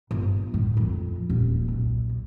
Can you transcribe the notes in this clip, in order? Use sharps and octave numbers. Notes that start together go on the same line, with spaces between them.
G1
A2
F2
D#1
B1